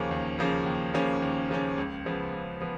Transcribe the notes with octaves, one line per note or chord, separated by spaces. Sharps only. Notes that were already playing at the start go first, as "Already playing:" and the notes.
Already playing: D#2 C#3 F3 A#3 C#4
D#2
C#3 F3 A#3 C#4
D#2
C#3 F3 A#3 C#4
D#2
C#3 F3 A#3 C#4
C#2
C#3 F3 B3
C#2
F3 B3